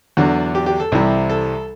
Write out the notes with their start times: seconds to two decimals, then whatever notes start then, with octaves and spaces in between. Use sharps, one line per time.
0.17 E2 D3 F#3 F#4
0.55 G4
0.66 G4
0.80 A4
0.92 C2 C3 E3 G3
1.29 A4